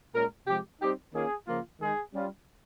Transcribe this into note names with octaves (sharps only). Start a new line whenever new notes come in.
A#2 G#3 C#4 A#4
C3 F3 G#3 G4
G3 C4 D#4 G4
D#3 A#3 C#4 F4 G#4
C#3 F3 A#3 F4
D#3 G#3 D#4 G#4
G3 C#4 F4